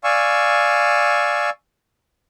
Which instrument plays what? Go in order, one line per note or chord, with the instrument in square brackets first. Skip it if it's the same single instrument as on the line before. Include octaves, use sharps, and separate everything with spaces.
[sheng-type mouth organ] D5 F5 G#5 C#6 E6